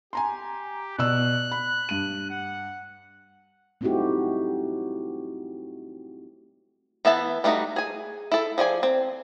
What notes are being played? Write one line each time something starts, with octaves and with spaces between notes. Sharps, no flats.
G4 G#5 A#5 C6
B2 D5 E6 F#6
B5
G2 D#7
F#5
A3 C4 D#4 E4 F#4 G4
E3 B3 E5 A5
G3 A3 D4 D#4 F#4
G#4 G#5
E4 A4
F3 G#4 D5 G#5
C4